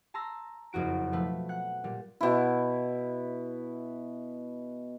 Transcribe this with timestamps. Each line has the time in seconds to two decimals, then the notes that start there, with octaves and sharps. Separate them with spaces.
0.14 A5 A#5 C6 E6 A#6
0.73 F#1 F2 F#4 D7
1.12 B2 F3 A3 B4
1.49 F#5 F#6
1.84 A#2 G3
2.21 B2 E4